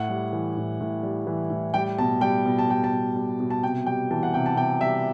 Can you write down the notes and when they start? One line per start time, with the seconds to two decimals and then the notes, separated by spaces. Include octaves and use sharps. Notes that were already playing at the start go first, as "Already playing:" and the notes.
Already playing: A2 F#5
0.09 G3
0.33 E3
0.57 A2
0.80 A2
1.03 G3
1.27 E3
1.50 A2
1.74 G3 G5
1.98 B2 A5
2.21 G3 G5
2.46 B2
2.59 A5
2.68 G3 G5
2.84 A5
2.93 B2
3.15 G3
3.40 B2
3.50 A5
3.63 C3 G5
3.86 G3 G5
4.11 E3 A5
4.23 F#5
4.34 C3 G5
4.46 A5
4.57 C3 G5
4.81 G3 E5